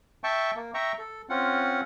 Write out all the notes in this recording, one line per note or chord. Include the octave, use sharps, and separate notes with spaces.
E5 G5 A5 C#6
A#3
E5 G5 A#5 C#6
A4
C4 C#4 F4 F#5